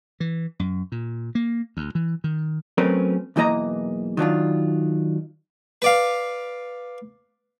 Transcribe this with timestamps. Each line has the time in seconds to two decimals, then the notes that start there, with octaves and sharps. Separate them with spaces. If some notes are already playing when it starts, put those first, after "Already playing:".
0.20 E3
0.59 F#2
0.92 A#2
1.35 A#3
1.77 D2
1.95 E3
2.24 D#3
2.78 F#3 A3 C4 C#4 A#4 B4
3.36 B1 E2 E3 A#3 D#5 A#5
4.17 D#3 F#3 D4 F4
5.82 B4 D5 F5